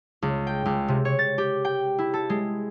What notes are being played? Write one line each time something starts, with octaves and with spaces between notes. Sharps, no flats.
C#2
G5
C#2
C3
C#5
A6
G4
G5
E4
A4
G#3